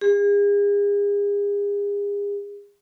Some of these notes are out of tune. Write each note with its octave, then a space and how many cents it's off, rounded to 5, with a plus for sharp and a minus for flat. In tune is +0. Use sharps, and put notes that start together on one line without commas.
G#4 -40